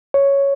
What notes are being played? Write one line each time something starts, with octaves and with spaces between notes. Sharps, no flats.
C#5